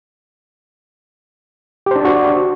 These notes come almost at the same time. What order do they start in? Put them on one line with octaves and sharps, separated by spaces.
G4 C5 D4 D5 F#4